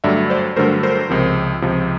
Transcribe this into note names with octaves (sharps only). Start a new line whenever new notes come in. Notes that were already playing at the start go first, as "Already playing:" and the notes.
G2 D3 F#3 A3 D5 E5
C5 D5
G2 D3 F#3 A3 A#4 C5
A#4 C5
C#2 C3 F3
C#2 C3 F3